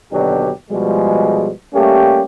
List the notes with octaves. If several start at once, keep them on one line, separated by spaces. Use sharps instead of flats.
D#2 B2 D3 F#3 D4 G4
B2 F3 G3 G#3
G3 A3 A#3 C#4 G4